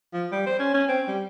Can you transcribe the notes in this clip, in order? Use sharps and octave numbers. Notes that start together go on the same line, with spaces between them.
F3
G3
C5
C#4
C#4
C4
G3